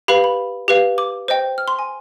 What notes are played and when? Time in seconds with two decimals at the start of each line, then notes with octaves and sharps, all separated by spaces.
0.08 G4 B4 F5 B5
0.24 B5
0.68 G4 B4 F5
0.98 D6
1.28 C5 D#5 G5
1.58 F6
1.68 C6
1.79 G#5